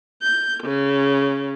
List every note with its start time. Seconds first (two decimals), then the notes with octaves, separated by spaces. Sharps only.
0.23 G6
0.63 C#3